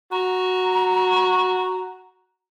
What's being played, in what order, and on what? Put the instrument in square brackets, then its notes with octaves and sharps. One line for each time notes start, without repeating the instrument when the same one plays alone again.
[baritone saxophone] F#4 [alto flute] A#5